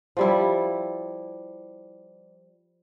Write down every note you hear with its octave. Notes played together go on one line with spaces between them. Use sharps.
F3 G3 E4